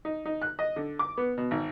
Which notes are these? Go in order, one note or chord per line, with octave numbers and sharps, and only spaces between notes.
D#4
D#4
F#6
D#5
D3
D6
B3
B2
G#1